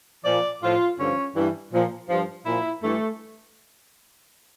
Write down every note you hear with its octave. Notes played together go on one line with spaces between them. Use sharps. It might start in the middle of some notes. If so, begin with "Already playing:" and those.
A#2 F3 D5
A2 F3 F4
G2 D3 F3 C#4
G2 E3
A#2 F3
G2 F3
A#2 F3 E4
G2 E3 A3